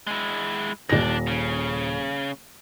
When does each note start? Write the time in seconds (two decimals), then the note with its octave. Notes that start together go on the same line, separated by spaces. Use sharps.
0.07 G#3 E4
0.90 D#1 D#2 D4 A#6
1.27 C#3